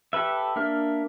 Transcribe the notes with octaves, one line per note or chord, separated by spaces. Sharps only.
G4 A4 B4 E5
A#3 D4 E5 F6